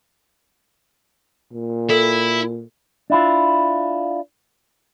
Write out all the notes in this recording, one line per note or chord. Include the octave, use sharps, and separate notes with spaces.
A#2
E4 A4
D4 E4 F4